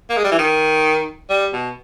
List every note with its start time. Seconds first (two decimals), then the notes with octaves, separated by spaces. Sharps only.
0.10 A#3
0.17 G#3
0.24 G3
0.31 E3
0.39 D#3
1.29 G3
1.53 B2